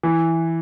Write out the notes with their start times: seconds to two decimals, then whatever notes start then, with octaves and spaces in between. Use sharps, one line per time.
0.03 E3